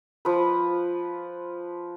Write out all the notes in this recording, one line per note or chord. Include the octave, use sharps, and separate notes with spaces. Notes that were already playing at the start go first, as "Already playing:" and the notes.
F3 B4